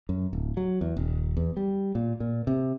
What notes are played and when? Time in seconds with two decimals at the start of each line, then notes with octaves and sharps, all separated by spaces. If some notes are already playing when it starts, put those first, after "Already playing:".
0.09 F#2
0.33 D1
0.57 F#3
0.81 E2
0.97 D#1
1.37 E2
1.57 G3
1.95 A#2
2.20 A#2
2.47 C3